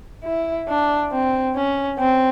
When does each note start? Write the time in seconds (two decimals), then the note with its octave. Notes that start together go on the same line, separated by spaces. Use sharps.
0.24 E4
0.68 D4
1.12 C4
1.56 C#4
1.99 C4